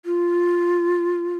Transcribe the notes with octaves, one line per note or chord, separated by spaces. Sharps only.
F4